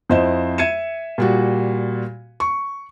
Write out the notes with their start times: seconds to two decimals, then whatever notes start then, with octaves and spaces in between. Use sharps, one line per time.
0.09 F2 E4 C5 D#5 E7
0.58 E5 G#6 C#7 D#7 E7
1.18 A#2 G3 F#4
2.40 C#6